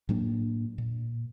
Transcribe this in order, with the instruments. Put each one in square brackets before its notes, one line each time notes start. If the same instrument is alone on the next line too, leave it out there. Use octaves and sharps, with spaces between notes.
[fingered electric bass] A2 F#3 A#3 D4
A#2